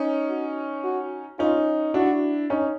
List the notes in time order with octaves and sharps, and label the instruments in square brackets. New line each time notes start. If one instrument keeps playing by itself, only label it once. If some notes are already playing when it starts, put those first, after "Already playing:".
Already playing: [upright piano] C#4 D#4
[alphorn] F#4
F#4
[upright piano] C#4 D#4 [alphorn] F4
[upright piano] D4 E4 [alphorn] F#4
[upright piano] C#4 D#4